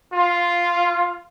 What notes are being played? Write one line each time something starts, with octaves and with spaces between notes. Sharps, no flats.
F4